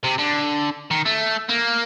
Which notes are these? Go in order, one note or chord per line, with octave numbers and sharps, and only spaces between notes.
C3
D3
D#3
A3
A#3